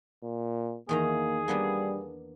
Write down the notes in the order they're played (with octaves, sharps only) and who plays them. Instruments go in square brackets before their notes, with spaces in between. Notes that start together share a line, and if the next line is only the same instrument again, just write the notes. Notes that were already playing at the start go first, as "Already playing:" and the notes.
[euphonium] A#2
[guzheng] E2 D#3 A#5 [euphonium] A#3 [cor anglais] G#4
[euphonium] G3 [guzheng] A#3 B3 D4